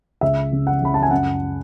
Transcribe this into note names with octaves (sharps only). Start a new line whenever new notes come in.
C#2 E5
C#3
F#5
C#2 B5
A5
G#5
F#2 F#5